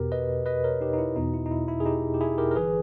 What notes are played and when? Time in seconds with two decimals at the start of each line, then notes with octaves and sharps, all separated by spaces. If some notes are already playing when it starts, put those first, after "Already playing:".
Already playing: E2 B2 G4 A#4
0.12 B4 D#5
0.46 B4 D#5
0.64 A#4 C#5
0.81 D#4 G4
0.94 D#4
0.98 E4
1.16 E2 B2 D#4
1.34 E4
1.46 D#4
1.51 E4
1.68 E4
1.80 G#4
1.85 D#4 G4
2.14 G4
2.21 E4 G#4
2.38 G4 A#4
2.51 A#4
2.55 G1 E3 G#4 B4